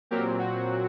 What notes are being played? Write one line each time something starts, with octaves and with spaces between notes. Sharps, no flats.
A#2 F#3 C4 G4 A#4
F#4